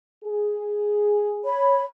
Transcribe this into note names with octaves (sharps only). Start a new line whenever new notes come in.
G#4
C#5 B5